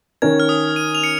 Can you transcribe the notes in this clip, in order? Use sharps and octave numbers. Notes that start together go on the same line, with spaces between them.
D#3 C#4 A#4 C#5 G#6
F6
D#6
D#7
F7
C#7